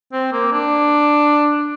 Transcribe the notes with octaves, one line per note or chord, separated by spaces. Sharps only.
C4
A#3
D4